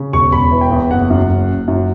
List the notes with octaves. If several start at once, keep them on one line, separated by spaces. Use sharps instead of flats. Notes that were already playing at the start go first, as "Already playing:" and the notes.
Already playing: C#3
E1 C#6
E1 B5
E3
G5
E2
F#1 F#5
F#2
F#1
F#1
F#2